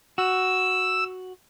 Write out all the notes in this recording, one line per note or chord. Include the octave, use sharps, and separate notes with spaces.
F#4 E6